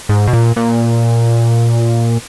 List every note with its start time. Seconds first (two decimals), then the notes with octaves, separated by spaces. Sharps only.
0.09 G#2
0.27 B2
0.33 A#2
0.56 A#2